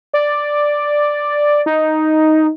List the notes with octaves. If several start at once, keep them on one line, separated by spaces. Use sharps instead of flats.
D5
D#4